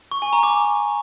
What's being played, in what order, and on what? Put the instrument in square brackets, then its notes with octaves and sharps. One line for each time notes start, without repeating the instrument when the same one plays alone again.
[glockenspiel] C#6
G#5
A#5
D6